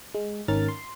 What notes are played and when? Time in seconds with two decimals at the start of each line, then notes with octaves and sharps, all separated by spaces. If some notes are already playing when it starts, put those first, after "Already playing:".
0.15 G#3
0.48 G#1 D#3 C#4 A#4 F6 A6
0.68 C6